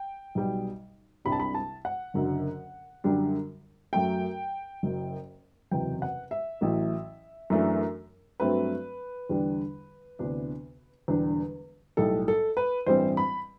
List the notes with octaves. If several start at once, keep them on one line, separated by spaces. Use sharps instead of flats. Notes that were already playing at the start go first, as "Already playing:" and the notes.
Already playing: G5
B1 B2 G3
C2 C3 G3 D4 B5
A5
B5
A5
F#5
F#1 F#2 D3 F#3
F#2 D3 G3 D4
F#2 F#3 A3 G5
F#1 F#2 F#3
F#1 E2 C3 F#3 G5
F#5
E5
A1 A2 F#3 A3
F#2 E3 A3 D4
G2 F#3 A3 C4 B4
E2 D3 G3 D4
D2 C3 E3 B3 D4
E1 E2 D3 G3 D4
B1 A2 G3 A4
A4
B4
A1 G2 E3 G3 C4 C5
B5